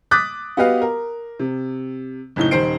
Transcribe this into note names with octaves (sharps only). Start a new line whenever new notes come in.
D6 D#6 F#6 A6 B6
B3 F#4 G4 B4 D#5 F5
A#4
C3
F#1 A2 D#4 G7
D#1 D#3 C5 C7 D7